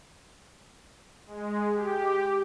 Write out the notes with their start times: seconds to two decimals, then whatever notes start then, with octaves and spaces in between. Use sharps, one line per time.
1.27 G#3
1.73 G4